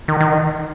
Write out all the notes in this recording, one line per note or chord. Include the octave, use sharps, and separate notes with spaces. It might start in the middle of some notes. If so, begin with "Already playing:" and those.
D#3
D#3